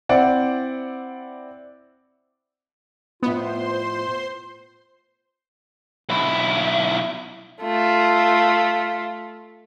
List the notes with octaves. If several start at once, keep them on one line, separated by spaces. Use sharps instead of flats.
C4 E4 D5 F#5
F2 A2 B3 F4 C5 C6
B1 E4
A3 F4